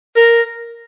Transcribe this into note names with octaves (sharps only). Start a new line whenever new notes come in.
A#4